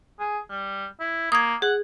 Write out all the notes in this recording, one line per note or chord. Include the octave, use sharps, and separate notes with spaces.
G#4
G3
E4
A#3 D#6 G#6
G#4 F#5